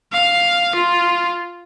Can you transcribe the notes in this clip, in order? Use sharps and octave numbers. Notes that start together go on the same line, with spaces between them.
F5
F4